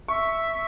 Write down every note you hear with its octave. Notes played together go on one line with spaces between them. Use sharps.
E5 C#6